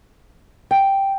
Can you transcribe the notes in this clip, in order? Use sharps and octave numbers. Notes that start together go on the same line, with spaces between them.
G5